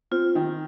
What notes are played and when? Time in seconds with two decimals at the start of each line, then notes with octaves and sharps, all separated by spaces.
0.11 C4 F4
0.35 D#3